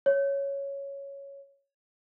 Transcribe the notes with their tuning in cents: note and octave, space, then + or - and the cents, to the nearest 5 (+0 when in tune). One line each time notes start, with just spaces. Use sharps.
C#5 +0